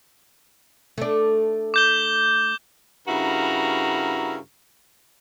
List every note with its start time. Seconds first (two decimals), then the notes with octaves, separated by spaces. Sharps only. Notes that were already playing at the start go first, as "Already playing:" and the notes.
0.98 A3 D4
1.74 D6 G6 G7
3.08 G2 C#3 E4 F#4 A#4 A#5